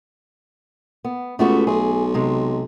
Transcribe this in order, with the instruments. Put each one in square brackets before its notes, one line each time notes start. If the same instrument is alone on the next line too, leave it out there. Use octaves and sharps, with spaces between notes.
[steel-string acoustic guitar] B3
[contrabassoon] C#2 [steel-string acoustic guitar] A3 B3 F#4
[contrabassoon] B1 [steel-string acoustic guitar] G#4
[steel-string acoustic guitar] C3 G#3